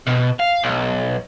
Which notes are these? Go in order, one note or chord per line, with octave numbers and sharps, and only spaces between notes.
B2
F5
B1